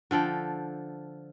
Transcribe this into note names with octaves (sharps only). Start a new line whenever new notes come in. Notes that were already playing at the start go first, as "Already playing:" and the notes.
D3 F3 A4 G5